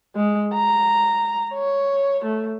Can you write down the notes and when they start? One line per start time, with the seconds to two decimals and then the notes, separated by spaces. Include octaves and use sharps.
0.16 G#3
0.54 A#5
1.54 C#5
2.25 A3